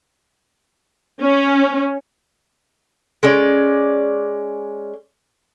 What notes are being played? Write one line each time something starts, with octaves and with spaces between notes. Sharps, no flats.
C#4
G#3 C#4 D5